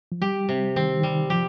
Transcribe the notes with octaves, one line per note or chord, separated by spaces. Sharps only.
F3
G3 G4
C3
D#3 C4
D#3 G3
F3 G4